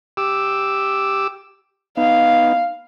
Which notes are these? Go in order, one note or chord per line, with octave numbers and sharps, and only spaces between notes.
G4 D6 E6
B3 D#4 F5